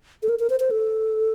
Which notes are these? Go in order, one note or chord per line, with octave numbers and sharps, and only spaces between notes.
A4
A#4
A#4
C5
C5
A4